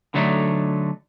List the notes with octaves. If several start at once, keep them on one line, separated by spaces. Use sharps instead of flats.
D3 F#3 A3 D4 D#4